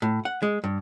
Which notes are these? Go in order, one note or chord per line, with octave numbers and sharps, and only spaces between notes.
A2
F#5
G#3
G2